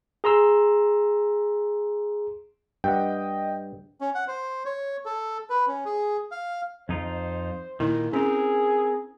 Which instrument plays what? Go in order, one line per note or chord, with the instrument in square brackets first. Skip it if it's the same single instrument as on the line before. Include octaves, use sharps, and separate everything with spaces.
[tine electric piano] G#4 A#5 C6 E6
[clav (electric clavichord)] G2 F#5 [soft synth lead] D#5 [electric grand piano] G5
[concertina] C#4
F#5
C5
C#5
A4
B4
C#4
G#4
F5
[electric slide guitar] F2 D#4 F4 [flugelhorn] C5
[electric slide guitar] A#2 D#3 [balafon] E4
[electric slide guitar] C4 A#4 [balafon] C#4 [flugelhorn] G#4